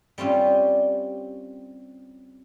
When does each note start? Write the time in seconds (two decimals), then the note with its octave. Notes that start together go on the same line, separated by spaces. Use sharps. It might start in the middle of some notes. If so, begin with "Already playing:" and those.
0.18 G3 C4 C#4 F4 G4